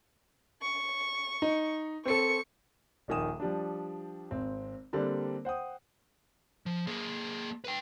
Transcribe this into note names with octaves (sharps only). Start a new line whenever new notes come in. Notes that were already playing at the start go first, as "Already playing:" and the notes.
C#6
D#4
C4 A4 C#6 C#7
D#1 A#1 D#3 G#5 D#6 E7
F3 G3 D4
G#1 C4
D3 G3 A#3 C4 D4
C5 F#5 G5 D#6
F3
A#3 G#4
B4 G5